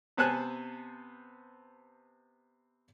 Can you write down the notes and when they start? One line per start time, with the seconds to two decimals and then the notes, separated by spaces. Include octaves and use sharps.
0.17 C3 B3 C5 G#5 A5 F#6